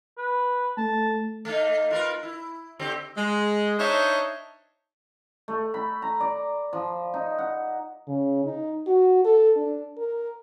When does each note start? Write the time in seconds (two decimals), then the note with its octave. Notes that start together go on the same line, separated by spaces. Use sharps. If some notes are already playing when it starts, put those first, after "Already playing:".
0.18 B4
0.78 A3 A5
1.45 A3 A#3 D#4
1.91 F4 A#4 B4
2.23 E4
2.79 D3 C4 G4
3.17 G#3
3.79 D4 D#4 C5 C#5 D#5 E5
5.48 A3
5.74 B5
6.02 A#5
6.20 D5
6.73 F3
7.14 D#4
7.38 F#5
8.07 C#3
8.45 D#4
8.87 F#4
9.25 A4
9.56 D4
9.98 A#4